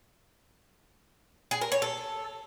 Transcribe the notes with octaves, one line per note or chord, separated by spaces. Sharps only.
G#4
A#4
C#5
A4